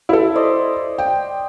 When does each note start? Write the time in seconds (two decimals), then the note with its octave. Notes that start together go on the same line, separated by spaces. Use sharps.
0.09 E4 A4
0.35 C5 D5 D#5
0.98 G5